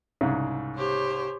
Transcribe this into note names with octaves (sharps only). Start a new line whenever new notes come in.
C2 G#2 C#3
G4 C5 C#5